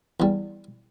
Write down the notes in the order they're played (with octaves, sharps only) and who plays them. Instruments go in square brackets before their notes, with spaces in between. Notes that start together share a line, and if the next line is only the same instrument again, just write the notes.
[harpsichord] E2 G3